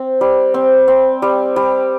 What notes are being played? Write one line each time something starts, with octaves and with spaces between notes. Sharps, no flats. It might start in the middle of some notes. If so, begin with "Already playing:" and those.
Already playing: C4
G3
C4
C4
G3
G3